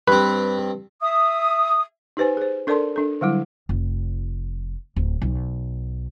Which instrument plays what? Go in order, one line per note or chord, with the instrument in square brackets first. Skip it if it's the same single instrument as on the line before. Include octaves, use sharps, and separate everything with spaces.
[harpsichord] G2 C4 [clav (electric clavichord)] B4
[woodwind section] E5 D#6
[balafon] D#4 G4 B4 C5 G#5
G#4 C5
D4 A4 A#4 D5 A5 C6
D4 A4
D3 F#3 G3 E4
[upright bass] F1
D1
B1